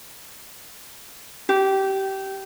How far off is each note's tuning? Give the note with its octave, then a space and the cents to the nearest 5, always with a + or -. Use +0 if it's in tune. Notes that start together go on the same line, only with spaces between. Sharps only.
G4 -20